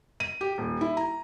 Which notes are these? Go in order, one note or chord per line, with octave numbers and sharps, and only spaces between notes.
D#7
G4
D#1
E4
A#5